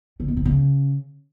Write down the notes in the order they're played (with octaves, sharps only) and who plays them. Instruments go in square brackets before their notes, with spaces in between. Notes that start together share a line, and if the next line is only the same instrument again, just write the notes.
[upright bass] D3
B2
C3
C#3